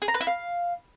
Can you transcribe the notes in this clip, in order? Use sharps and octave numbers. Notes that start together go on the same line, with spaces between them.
G#4
A#5
B4
E4
F5